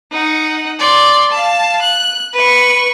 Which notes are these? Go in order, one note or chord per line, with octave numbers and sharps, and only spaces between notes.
D#4 F#5
D5 C6
F5 A5
F#6
B4 C#6